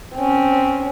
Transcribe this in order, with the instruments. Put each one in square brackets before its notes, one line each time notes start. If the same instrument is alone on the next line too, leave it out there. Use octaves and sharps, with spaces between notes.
[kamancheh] C4 C#4